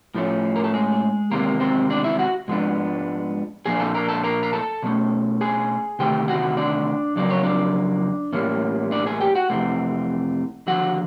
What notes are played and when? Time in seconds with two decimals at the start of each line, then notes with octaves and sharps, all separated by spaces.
0.15 A2 F3 A3 C#4
0.56 A#4
0.64 A4
0.74 G#3 G#4
1.31 E2 C3 D#3 G#3 A#3 C4 A#4
1.60 C4 C5
1.90 D4 D5
2.04 E4 E5
2.19 F#4 F#5
2.48 G#2 F3 G#3 B3 D4
3.66 A#2 F3 A#3 D4 G#4 G#5
3.80 A4 A5
3.94 A#4 A#5
4.09 A4 A5
4.23 A#4 A#5
4.43 A#5
4.53 A4 A5
4.83 B2 F#3 A3 C#4
5.41 G#4 G#5
5.99 D2 C3 D#3 A3 G4 G5
6.28 F#4 F#5
6.57 D4 D5
7.16 F2 C#3 F#3 A#3 D5
7.30 C#5
7.43 D4 D5
8.33 A2 E3 G3 A#3 C#4
8.91 D4 D5
9.06 G#4 G#5
9.21 G4 G5
9.35 F#4 F#5
9.50 F2 C3 E3 A3 C4
10.67 D#2 D3 F3 F#4 F#5